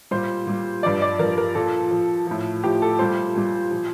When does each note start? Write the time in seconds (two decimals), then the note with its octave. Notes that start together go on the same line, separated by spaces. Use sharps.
0.11 A#2 G3 C5
0.47 A#2 G3
0.83 G2 F3 D5
1.02 D5
1.19 G2 F3 A#4
1.38 A#4
1.55 A#2 F3 A4
1.91 A#2 F3
2.27 A2 F3
2.64 A2 F3 G4
2.82 A4
2.99 A#2 G3 C5
3.36 A#2 G3
3.71 A#2 F3